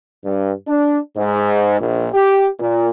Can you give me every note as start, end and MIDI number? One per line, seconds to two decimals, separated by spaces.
0.25 0.52 43
0.68 0.98 62
1.16 1.78 44
1.81 2.09 34
2.14 2.48 67
2.60 2.89 46